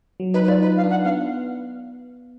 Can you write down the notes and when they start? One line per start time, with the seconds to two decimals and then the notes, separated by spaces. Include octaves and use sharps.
0.20 F#3
0.34 D#4 B4
0.44 B4
0.48 F4 D5
0.62 D#4 B4
0.77 F5
0.84 D4
0.90 F#5
1.04 B3 F5